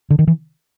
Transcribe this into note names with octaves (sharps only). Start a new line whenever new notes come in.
D3
D#3
E3